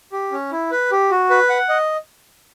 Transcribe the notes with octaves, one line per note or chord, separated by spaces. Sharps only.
G4
C#4
E4
B4
G4
F#4
B4
F#5
D#5